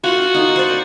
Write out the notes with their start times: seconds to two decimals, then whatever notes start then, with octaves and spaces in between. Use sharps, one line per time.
0.04 F4 F#4
0.34 D#4 F4
0.56 C5 D5